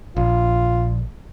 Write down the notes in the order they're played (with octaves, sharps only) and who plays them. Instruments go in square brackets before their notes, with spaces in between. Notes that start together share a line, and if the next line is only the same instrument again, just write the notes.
[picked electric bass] A#1 [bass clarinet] F4